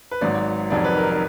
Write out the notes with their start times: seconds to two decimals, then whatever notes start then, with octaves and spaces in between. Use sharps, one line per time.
0.11 B4
0.21 G#1 G#2 F#3 D5
0.70 F1 F2 D#3 F#3 D5
0.85 B4
0.98 A#4
1.11 B4